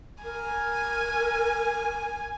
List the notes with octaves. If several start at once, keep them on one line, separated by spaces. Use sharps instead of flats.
A#4 G#5